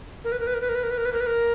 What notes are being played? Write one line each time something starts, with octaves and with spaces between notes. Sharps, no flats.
A#4
B4
A#4
B4
A#4
B4
A#4
B4
A#4
B4
A#4
B4
A#4
B4
A#4